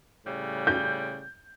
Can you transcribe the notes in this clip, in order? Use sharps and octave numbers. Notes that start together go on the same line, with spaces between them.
A2 C#3 G3
G6